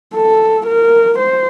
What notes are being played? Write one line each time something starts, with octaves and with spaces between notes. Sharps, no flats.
A4
A#4
C5